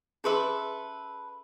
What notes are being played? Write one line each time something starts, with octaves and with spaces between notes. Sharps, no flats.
C#4 G#4 A4 B4 E5 C6